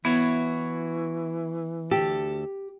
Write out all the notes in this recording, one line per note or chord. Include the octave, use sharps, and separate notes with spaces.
E3 B3 E4 F#4 C#5
D2 G4 A4